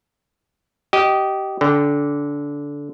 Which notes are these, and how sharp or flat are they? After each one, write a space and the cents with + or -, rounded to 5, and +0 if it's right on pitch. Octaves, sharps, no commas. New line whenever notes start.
G4 -20 D#5 +0
D3 -20 G5 +0